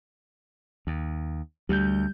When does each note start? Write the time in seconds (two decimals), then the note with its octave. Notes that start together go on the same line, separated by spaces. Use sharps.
0.87 D#2
1.69 D2 G3 G6